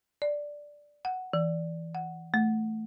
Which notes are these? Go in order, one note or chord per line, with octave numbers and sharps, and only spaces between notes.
D5
F#5
E3
F#5
A3